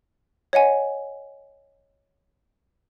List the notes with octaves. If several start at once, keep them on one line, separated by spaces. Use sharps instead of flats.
C#5 D#5 F#5 G#5